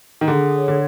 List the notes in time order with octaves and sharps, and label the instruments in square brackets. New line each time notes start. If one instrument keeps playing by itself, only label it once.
[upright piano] D#3
[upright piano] D3 [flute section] G#4
[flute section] C#5
[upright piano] D3